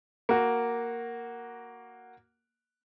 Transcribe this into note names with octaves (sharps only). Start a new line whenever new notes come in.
A#3 F#4